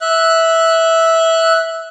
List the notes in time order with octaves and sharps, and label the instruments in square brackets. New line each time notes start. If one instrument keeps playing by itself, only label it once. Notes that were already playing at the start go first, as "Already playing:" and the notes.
[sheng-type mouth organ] E5 F#6